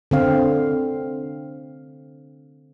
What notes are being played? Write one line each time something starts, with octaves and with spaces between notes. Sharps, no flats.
D3 C4 F5